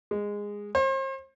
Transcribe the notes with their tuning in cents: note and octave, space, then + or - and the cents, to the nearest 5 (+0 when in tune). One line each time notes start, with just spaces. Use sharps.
G#3 -15
C5 +40